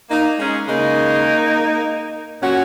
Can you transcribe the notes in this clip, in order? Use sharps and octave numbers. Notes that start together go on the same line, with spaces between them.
A#3 D#4
G#3 C#4
C#3 G#3 A#3 D#4
A#2 F#3 C#4 F#4